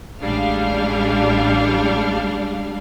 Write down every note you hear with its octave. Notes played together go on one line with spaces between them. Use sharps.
A1 G3 G#3 D4 F5